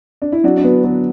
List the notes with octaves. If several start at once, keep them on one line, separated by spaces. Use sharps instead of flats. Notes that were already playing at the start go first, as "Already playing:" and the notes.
D4
E4
F#3 D4 F#4
D4
F#3 B3
F#3 B3